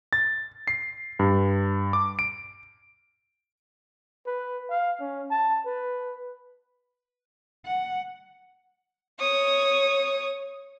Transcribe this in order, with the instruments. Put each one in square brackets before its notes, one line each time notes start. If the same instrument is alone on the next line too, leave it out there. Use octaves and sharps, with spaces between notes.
[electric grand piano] A6
C7
G2
D6
D7
[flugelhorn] B4
F5
C#4
A5
B4
[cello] F#5
[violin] C#5 D#6